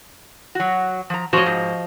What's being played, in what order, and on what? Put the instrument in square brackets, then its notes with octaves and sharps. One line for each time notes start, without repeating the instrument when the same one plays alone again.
[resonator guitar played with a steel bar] F#3 F#4
F3 A#5
[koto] F3 D#5 [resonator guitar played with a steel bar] F#4 C#5
[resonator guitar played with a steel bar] G#2